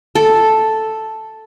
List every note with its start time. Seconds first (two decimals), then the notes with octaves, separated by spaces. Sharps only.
0.15 A4